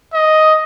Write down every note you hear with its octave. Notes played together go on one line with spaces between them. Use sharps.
D#5